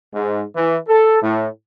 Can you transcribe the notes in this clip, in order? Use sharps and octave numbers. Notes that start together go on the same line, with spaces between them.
G#2
E3
A4
A2